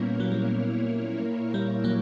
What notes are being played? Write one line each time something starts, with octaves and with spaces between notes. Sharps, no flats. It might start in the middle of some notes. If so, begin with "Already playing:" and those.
Already playing: A#2 G3 A#3 B3 C#4 E4 A#4 C#5
F#3
G3
G3
F#3 A#3